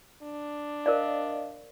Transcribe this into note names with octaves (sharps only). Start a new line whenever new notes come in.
D4
A#4 C5 D5 D#5 F5